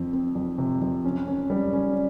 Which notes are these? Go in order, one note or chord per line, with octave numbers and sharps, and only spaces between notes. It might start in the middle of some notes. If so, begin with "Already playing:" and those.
Already playing: F2 C4
C4
F2
C3
F2
C#4
C#4
G3
C#4